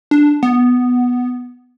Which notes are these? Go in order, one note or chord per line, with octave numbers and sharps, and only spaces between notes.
D4
B3